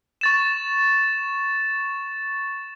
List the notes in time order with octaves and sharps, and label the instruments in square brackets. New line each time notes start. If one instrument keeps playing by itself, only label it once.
[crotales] C#6 A6 E7